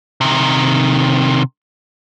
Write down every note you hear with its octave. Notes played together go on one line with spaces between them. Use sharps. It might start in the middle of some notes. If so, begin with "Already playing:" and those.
C3 D#3